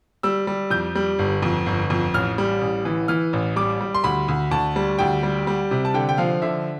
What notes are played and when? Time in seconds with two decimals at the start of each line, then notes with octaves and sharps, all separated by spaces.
0.23 G3 E6
0.47 G3
0.70 F2 G6
0.95 G3
1.19 G1
1.43 F2
1.66 G1
1.90 F2
2.14 A1 F6
2.38 G3
2.61 A1
2.85 E3
3.08 E3 F6
3.33 A1
3.56 G3 D6
3.81 G3
3.94 C6
4.04 D2 B5
4.28 D2
4.51 D2 A5
4.76 G3
4.99 D2 G5
5.23 G3
5.47 G3
5.71 C3
5.85 A5
5.94 D3 G5
6.09 G5
6.18 F3 F5
6.42 D3 E5